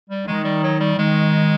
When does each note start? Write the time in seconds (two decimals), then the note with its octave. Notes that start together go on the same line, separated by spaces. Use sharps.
0.10 G3
0.27 D#3 G#3
0.45 G3
0.63 F#3
0.80 G3
0.99 D#3 G#3